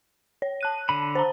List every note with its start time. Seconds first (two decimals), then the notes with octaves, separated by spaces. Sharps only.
0.42 C#5
0.61 A5 F#6 D#7
0.89 D3 B5
1.15 C5 A5 A#5